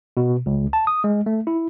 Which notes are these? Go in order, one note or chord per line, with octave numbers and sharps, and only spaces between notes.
B2
C#2
A5
D#6
G#3
A3
E4